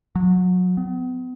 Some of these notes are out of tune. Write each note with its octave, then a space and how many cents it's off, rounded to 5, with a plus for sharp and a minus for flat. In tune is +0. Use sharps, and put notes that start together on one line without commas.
F#3 -30
B3 +40